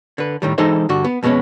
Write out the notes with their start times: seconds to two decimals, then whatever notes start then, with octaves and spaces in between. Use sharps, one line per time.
0.18 D3 B4
0.42 A2 D#3 G3
0.58 E3 G#3 D#4 A4 C5 D#5
0.89 G2 D3 F#4
1.05 B3
1.23 F2 B2 G#3 A3 B3 C#4